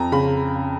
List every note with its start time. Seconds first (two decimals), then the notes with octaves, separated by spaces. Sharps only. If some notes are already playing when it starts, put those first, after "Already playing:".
Already playing: F2 A#5
0.12 C#3 B5